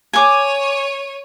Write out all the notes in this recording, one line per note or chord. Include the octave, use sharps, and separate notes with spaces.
C#5 G#5 D6 D#7